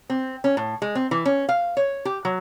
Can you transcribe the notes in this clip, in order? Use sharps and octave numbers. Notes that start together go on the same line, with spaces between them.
C4
C#4
A2
G#3
C4
E3
C#4
F5
C#5
G4
F#3